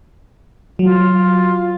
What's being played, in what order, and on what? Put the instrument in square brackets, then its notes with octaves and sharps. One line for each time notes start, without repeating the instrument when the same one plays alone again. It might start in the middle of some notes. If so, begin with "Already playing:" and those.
[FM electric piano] F#3 [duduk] F4